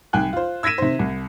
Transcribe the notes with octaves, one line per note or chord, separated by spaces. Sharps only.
C2 D#3 G5 G#5 F#6
F4 C5
E6 G#6 A#6 B6 D#7 E7
C3 D#3 C5
C2